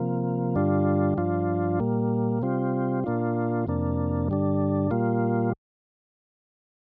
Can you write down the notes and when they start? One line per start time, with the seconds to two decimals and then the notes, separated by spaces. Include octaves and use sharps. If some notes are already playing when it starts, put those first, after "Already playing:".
Already playing: C3 F3 A#3
0.56 G2 D3 G3 D4 F4
1.17 G2 F3 D4 F4
1.80 A#2 G3 A#3
2.42 C3 G3 C4 F4
3.04 A#2 A#3 D4 F4
3.67 F2 C3 A#3 D4
4.28 G2 D3 G3 D4
4.91 A#2 G3 A#3 F4